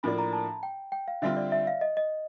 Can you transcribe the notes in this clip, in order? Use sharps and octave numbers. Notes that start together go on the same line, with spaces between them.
A2 F3 A#3 D4 B5
A#5
A5
G5
G5
F5
D3 G3 C4 F4 E5
D5
E5
F5
D#5
D#5